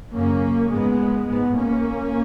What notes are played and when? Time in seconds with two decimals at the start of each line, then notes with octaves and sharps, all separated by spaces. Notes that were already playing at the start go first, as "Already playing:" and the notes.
0.14 F#2 C#3 A#3 C#4
0.71 G#2 G#3 B3
1.28 G#2 G#3 B3
1.57 A#3 C#4